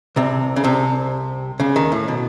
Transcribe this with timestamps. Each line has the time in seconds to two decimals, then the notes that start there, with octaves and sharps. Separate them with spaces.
0.16 C2 C3
0.56 C#3
0.64 C2 C3
1.60 C#2 C#3
1.76 D#2 D#3
1.92 A2
2.08 B2